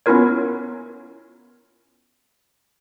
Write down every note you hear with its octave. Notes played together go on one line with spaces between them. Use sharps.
B3 C#4 E4 F4 A#4 C#5